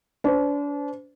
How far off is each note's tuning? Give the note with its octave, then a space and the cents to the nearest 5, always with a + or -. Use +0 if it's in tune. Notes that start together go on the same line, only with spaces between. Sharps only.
D4 -35 C5 -35